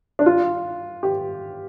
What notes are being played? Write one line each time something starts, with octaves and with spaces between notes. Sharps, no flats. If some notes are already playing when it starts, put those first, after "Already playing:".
D4
F4
G4